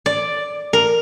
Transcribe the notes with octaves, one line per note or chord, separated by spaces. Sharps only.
D5
A#4